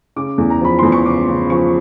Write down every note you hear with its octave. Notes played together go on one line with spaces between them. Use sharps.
C#3 D6
E2
A#5
F3 B5
E2 C6
C#6
C#3 D6
C#3
F3 C#6